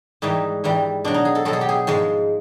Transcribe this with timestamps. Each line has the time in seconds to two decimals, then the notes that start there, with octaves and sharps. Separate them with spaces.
0.22 G#2 E3 G3 D#4
0.64 G#2 E3 G3
1.05 B2 F#3 D4
1.14 D#4
1.25 G#4
1.35 A4
1.45 B2 F#3 A4
1.53 G#4
1.61 G4
1.69 G#4
1.87 G#2 F3 G#3